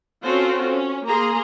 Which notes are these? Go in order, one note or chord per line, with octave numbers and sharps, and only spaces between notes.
C4 C#4 F4 F#4 A4 C5
C#4
A#3 G#4 A#5 C6